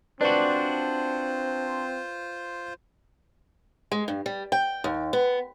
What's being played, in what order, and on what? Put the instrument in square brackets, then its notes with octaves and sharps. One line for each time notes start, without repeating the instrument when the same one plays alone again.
[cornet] C4 [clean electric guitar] D4 F#4 [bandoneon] F4 C5 [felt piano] B4 D5
[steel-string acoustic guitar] G#3
G2
G3
G5
D#2
B3